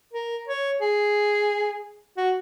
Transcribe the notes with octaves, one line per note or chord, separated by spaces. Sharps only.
A#4
C#5
G#4
F#4